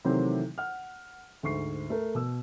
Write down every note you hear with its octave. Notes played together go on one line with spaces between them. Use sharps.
C3 D#3 E3 F#3 A3 C4
F#5 F6
D2 G#2 C#6 C7
A3 A#4
B2 E6